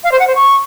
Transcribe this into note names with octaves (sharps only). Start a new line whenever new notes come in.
F5
C5
F#5
C5
C#6